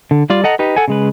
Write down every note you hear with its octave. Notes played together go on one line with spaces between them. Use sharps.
D3
G3 F4 D5
A4 D#5 F#5 A#5
D#4 G4 B4
A4 F#5 G#5
C#3 G#3 B4